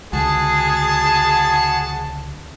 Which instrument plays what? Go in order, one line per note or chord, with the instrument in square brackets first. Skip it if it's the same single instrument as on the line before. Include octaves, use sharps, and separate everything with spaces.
[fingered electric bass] C#2 D3 [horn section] F#4 G#5 A5 [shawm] G#4